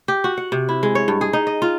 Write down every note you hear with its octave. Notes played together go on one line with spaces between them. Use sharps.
G4
F#4
F#5
C3
E4
G#3
C#5
G2
G#4
D#4
D#5
F4